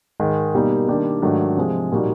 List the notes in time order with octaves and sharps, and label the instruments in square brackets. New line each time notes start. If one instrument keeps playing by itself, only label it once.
[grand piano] G#2 D#3 G#3
B2 G3 A#3 D#4
D#3 G3 A#3 D4 G4
G#2 D#3 F#3 A3 D4
C3 F3 G#3
A#2 G3 A#3 D#4 F#4